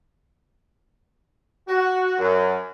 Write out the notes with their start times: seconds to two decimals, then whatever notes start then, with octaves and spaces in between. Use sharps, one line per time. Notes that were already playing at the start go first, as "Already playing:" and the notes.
1.68 F#4
2.19 F#2